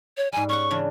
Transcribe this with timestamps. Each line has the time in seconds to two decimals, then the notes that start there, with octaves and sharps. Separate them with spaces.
0.17 C#5
0.32 G#2 G3 G#5
0.49 C#4 F#5 C#6
0.71 C#3 E3 D4